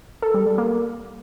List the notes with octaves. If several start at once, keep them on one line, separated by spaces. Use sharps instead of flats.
A4
G3
G3
A#3